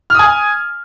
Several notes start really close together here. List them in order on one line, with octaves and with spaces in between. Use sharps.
F6 D#6 G#5